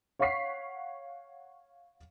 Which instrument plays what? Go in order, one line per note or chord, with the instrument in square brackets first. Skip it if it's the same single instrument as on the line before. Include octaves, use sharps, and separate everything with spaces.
[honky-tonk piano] C#5 F5 F#5 C#6 B6 C7